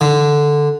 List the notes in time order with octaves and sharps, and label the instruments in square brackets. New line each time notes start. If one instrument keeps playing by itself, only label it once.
[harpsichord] D3